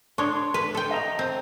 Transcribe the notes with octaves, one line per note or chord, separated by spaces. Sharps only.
D4 C#5 C6
B4
A4 G5
D#5 A5 A#5
C4